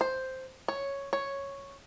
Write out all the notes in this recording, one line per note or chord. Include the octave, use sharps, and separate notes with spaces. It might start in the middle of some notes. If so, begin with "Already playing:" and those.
C5
C#5
C#5